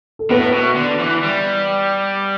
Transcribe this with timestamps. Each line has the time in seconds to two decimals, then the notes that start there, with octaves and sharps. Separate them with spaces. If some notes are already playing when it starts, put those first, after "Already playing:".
0.19 A4
0.30 A2 B3 B4
0.54 B2
0.76 D3
1.00 E3
1.23 G3